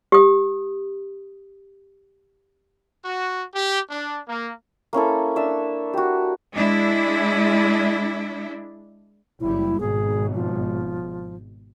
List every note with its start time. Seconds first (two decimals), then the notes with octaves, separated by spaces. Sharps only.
0.12 G4 D#6
3.05 F#4
3.55 G4
3.89 D4
4.27 A#3
4.93 A#3 C#4 E4 A4
5.36 D4 E5 E6
5.94 F#4 G4
6.54 G#3 D4 E4
9.41 F#1 G3 E4
9.80 G#1 G#2 B2 G#4
10.34 F3